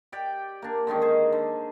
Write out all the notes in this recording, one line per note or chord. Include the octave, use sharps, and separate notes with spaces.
G4 D5 G5
A#3 D4
D3 D#3 G#3 C#4
G#4 C5
D3